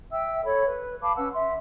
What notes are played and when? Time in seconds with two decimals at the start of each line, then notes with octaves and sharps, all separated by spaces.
0.12 E5 G5 E6
0.45 A4 C#5 B5
0.66 B4
1.02 F5 A5 B5 D6
1.17 C#4 B4 F#5 E6
1.33 E5 C6